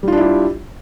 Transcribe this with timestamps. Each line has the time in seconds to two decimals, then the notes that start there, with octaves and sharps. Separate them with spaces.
0.03 G3
0.08 F4
0.12 D4
0.17 E4
0.22 G4